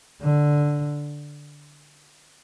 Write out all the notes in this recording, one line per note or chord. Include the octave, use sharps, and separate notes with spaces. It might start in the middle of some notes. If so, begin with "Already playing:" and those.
D3